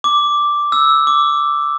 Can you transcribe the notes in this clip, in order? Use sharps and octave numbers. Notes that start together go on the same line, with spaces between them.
D6
E6
D6